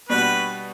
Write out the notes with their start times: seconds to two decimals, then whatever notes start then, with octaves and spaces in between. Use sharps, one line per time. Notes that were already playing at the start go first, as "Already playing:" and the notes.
0.09 B2 G3 D4 F#4 B4